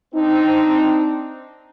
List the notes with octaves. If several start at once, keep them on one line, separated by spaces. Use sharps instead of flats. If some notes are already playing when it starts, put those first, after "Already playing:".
C4 D4 D#4